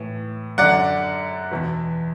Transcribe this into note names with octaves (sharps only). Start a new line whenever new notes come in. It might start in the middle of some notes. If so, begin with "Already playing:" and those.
Already playing: A2 E3
F#2 D3 D5 F#5
E2 B2